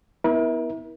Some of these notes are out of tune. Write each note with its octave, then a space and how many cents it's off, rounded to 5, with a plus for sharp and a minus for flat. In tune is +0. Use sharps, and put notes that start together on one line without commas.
B3 +0 E4 -25 A#4 +35